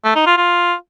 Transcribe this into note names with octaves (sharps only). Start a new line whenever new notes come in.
A3
D#4
F4
F4